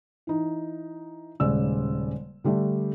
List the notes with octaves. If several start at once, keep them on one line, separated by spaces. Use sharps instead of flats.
E3 D#4
D#1 C#3 G#3 D5 E6
D3 G3 A3 D4